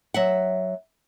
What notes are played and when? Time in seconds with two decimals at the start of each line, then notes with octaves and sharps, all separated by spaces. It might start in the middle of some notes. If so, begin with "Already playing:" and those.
0.14 F#3 E5 F#5